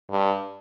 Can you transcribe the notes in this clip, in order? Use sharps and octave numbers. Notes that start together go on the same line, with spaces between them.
G2